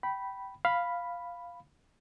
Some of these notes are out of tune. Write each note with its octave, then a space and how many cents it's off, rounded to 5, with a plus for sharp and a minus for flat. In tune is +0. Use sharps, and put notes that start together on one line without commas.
G5 -20 B5 -5
F5 +0 B5 +0